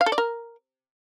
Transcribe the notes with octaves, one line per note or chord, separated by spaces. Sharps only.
F5
A4
D5
A#4